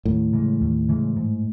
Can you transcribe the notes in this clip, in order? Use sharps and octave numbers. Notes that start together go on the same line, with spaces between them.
D#2 A2
C#3 E3 G#3
D#2
C#3 E3 G#3
G#2